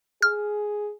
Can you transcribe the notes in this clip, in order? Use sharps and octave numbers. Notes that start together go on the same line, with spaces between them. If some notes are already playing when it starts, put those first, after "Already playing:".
G#4 F6